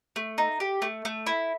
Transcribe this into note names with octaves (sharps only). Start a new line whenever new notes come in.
A3
D#4
G4
A3
A3
E4